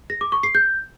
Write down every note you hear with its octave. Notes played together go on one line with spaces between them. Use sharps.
A#6
D6
C#6
C7
G6